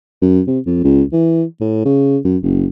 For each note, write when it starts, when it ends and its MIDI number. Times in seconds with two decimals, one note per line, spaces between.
0.22 0.41 42
0.47 0.59 48
0.66 0.79 41
0.84 1.03 37
1.12 1.44 52
1.61 1.84 45
1.85 2.18 49
2.25 2.37 42
2.43 2.66 30